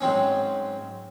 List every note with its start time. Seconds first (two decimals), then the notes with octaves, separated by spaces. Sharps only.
0.01 G#2 F#3 C4 C#4